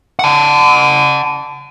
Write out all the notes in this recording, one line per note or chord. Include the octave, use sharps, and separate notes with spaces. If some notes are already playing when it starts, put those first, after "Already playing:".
F#5 A5